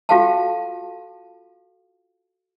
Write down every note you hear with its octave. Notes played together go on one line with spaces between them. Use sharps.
F4 F#4 A4 F5 G5 A5